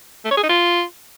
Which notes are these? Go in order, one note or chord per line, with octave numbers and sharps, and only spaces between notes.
A3
C#5
G#4
D#4
F4